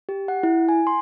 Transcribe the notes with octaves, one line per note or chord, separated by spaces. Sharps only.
G4
F#5
E4
G#5
C6